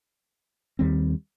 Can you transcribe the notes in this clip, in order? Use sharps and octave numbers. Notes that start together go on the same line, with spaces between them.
D#2 D#3 G3 C4